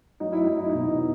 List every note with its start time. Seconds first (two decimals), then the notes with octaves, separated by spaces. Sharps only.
0.20 F#3 D#4
0.32 E4
0.45 F#3 D#4
0.58 E4
0.69 D#4
0.75 B2